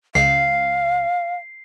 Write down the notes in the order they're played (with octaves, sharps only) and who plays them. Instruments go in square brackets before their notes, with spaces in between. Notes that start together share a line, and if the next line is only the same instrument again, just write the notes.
[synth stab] C#2 [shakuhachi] F5 [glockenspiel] C7